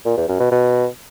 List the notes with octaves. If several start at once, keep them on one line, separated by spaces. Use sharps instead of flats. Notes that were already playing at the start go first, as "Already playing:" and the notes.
A#2
E2
F#2
B2
B2